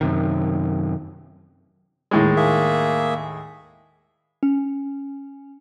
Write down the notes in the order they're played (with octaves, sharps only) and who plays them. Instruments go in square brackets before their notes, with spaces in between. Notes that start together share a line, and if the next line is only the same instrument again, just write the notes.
[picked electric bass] F#2 C3 D#3
[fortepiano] D#2 A2 G#3
[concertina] A#3 G#4 E5
[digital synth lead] C#4